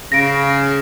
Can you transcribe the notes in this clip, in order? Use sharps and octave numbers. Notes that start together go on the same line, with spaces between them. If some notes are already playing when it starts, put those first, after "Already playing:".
C#3 A#6 D7